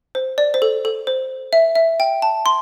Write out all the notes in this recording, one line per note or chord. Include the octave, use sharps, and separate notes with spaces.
C5
D5
C5
A4
A4
C5
E5
E5
G5
A5
C6